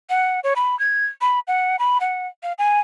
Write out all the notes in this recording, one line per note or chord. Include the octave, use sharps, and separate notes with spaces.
F#5
C#5
B5
G#6
B5
F#5
B5
F#5
F5
G#5